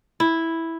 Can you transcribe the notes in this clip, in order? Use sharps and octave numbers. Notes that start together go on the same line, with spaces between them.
E4